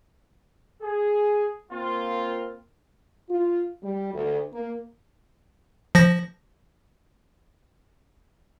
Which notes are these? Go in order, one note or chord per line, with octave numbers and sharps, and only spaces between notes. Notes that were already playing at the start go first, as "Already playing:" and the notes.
G#4
A#3 C4 F4
F4
G3
D2
A#3
F3 A#6